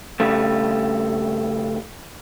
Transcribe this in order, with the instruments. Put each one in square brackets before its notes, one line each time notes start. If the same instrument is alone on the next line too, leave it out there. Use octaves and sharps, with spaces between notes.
[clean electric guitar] G2 C#3 G3 A3